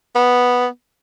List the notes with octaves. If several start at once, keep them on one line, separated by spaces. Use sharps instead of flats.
B3